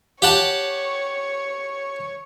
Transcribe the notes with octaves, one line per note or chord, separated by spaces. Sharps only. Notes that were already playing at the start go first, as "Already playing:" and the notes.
G4 C#5 F#5 A5